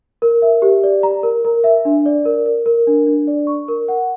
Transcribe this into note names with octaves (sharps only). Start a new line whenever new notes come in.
A#4
E5
G4
D5
A#5
A#4
A#4
E5
D4
D5
A#4
A#4
A#4
D4
D4
D5
C#6
A#4
F#5